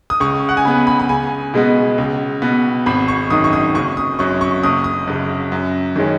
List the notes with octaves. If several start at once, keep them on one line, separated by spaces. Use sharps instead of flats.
D#6
C#2 C#6
F#5
G#5
C#3 B3 B5
B5
B5
C#2 G#5
B2 G#3 B3
C#2
B2 B3
G#1 B5
C#6
F#2 D#3 D#6
C#6
D#6
F#1 C#6
D#6
F#2 F#3 C#6
C#6
F#1 D#6
D#6
F#2 C#3
F#2
D#3 G#3 C#4